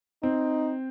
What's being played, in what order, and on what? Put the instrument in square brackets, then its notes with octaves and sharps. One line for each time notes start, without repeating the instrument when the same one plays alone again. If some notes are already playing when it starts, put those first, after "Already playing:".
[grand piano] C4 [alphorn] D#4